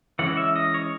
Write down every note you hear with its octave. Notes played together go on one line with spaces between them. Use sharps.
E3 G#3 C#4 F#5
E5
D#5
C#5